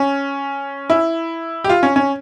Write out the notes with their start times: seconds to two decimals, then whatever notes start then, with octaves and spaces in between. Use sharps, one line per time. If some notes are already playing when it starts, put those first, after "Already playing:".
Already playing: C#4
0.90 E4
1.64 G4
1.69 F4
1.83 C#4
1.96 C#4